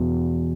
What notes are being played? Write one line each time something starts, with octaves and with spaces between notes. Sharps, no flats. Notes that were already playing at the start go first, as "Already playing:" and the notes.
Already playing: E2 B2